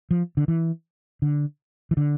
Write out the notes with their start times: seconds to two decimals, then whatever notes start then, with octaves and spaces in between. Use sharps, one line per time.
0.11 F3
0.37 D3
0.48 E3
1.22 D3
1.91 E3
1.97 D3